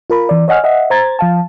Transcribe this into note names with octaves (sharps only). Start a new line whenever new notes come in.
F4 A#4 B5
E3 D5
C#5 D#5 F#5 G#5 F6
D#5 E5 F#5
C5 A#5 G#6 A6
F3 F5 A5